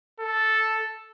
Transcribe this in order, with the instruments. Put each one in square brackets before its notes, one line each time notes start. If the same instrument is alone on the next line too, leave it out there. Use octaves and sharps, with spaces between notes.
[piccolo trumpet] A4